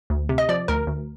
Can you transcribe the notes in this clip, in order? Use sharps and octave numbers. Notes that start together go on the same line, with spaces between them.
D2
C3
D#5
F3 D5
D2 A#4
D2